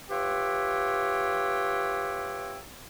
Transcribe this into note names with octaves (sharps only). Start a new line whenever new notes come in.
F4 G4 B4 C#5 E5 G5